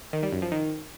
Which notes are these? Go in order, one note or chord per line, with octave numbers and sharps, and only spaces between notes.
D#3
G3
F#2
F3
D#3